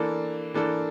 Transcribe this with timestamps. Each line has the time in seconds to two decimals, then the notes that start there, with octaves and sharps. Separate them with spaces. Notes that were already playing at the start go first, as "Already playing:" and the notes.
Already playing: E3 A#3 D4 A4
0.54 E3 A#3 D4 A4